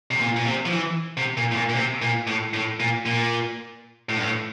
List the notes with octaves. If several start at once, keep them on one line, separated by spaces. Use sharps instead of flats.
C3
A#2
A#2
C3
F3
E3
C3
A#2
A2
A#2
A#2
C3
A#2
A2
A2
A#2
A#2
A2
G2
A2